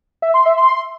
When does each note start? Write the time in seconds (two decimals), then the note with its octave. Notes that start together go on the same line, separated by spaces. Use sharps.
0.22 E5
0.34 C6
0.46 E5
0.57 C6